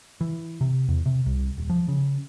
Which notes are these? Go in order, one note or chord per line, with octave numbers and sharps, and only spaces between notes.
E3
C3
E2
C3
C2
D#1
F3
C#3